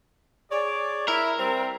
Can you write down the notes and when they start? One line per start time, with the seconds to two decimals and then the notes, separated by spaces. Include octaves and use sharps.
0.51 G#4 C#5 D5
1.08 E4 A#4
1.39 G3 C4